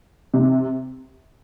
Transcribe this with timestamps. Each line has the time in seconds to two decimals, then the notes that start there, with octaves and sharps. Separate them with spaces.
0.34 C3